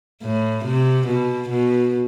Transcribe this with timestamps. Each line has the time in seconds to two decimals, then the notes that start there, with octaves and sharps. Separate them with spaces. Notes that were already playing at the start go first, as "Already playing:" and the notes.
0.22 A2
0.65 C3
1.07 B2
1.49 B2